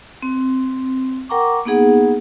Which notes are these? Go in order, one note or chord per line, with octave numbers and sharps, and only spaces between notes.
C4
A#4 F#5 G5 A#5 C#6 D6
A#3 B3 D#4 G#4 F#5